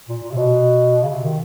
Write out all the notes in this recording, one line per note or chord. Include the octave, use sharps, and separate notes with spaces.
A#2
A#2
C3
B2
C#3
C3
D#3